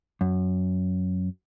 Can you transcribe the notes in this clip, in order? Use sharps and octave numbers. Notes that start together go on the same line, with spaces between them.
F#2